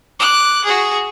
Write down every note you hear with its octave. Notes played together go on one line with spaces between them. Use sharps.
D6 F#6
F#4 G#4